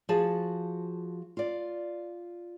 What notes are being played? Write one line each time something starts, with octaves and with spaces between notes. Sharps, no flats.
F3 F#4 G#4 A5
F4 D5